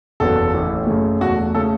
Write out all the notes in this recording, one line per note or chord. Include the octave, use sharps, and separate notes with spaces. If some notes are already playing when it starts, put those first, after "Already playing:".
F#1 E2 B2 F#3 B3 A4
A1 A2 E3 A3 C#4
F#2 C#3 A3
E2 B2 F#3 A3 F#4
C#3 A3 C#4 A4